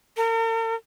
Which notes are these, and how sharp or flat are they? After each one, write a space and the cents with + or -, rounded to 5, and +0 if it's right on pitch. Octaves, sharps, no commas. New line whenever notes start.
A#4 -45